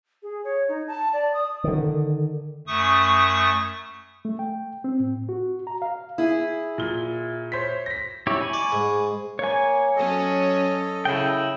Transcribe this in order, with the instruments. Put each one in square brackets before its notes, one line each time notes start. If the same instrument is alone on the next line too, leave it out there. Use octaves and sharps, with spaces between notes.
[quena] G#4
C#5
D#4
A5
D5
D#6
[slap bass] D3 D#3
[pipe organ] F#2 A3 C#6 D#6
[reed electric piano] A3
G5
C4
A2
F#4
A#5
F5
[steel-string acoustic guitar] E4 G#4
[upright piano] A#2 G7
C5 C#5 B6
A#6 B6
[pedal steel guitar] E4 G4 C#5
G#5 B5 C#6
[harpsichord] D5
G#2
[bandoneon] A#3 [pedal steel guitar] C#5 G#5
[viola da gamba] F#3 C#4 [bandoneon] A4 D#5
[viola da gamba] C#3 [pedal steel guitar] E4 G5